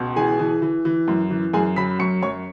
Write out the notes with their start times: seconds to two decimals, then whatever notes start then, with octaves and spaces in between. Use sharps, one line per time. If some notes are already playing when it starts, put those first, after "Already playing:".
Already playing: C#2 B2
0.16 E3 G#4 G#5
0.39 E3
0.62 E3
0.85 E3
1.08 F#2
1.31 E3
1.53 F#2 G#4 G#5
1.76 F#3 B5 B6
1.99 F#2 C#6 C#7
2.22 F#2 C#5 C#6